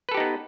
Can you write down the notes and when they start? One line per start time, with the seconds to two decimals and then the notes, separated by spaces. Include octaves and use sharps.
0.09 B4
0.12 A4
0.14 G4
0.17 D#4
0.20 B3